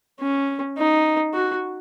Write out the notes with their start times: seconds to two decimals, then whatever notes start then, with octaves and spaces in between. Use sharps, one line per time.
0.20 C#4
0.78 D#4
1.34 F#4